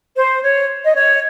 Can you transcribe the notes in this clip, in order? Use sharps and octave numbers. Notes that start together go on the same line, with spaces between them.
C5
C#5
D#5
C#5